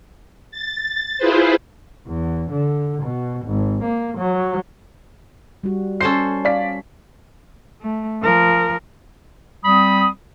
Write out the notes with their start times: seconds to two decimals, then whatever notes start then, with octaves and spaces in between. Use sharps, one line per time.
0.51 A6
1.18 E4 F4 G#4 B4 C5
2.07 E2
2.51 D3
3.02 B2
3.46 G#1
3.83 A#3
4.17 F#3
5.63 G3 F#4
6.01 C#4 A4 C5 C7
6.45 D5 F5 B6
7.81 A3
8.23 F3 A#4
9.65 G3 C4 B5 D#6